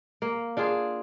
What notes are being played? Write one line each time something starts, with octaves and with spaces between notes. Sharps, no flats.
A#3
D4 F4 G#4